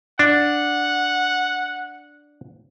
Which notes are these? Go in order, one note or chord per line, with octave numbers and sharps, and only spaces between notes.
D4 F#5